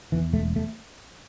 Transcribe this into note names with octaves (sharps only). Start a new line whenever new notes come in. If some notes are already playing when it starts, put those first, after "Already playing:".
E2 E3
E1 A3
A3